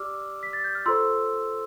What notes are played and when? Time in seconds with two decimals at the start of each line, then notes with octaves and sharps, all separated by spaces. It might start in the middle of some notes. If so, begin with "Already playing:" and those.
Already playing: G4 D5 D6 E6 F6
0.43 B6
0.53 A6
0.64 G6
0.75 F6
0.86 F4 A4 C5 C6 E6